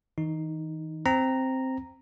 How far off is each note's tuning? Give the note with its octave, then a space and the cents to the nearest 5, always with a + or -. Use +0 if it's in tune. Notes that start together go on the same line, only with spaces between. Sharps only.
E3 -45 D#4 +0
C4 +0 A#5 -5